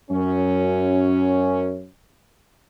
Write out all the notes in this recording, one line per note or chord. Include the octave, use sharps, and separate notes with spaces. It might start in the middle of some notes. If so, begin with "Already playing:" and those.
F#2 C#4